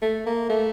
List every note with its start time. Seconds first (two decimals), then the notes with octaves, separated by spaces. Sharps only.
0.02 A3
0.27 A#3
0.50 A3